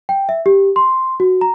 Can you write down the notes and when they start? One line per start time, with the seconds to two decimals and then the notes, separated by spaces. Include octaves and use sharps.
0.09 G5
0.29 E5
0.46 G4
0.76 C6
1.20 F#4
1.41 A#5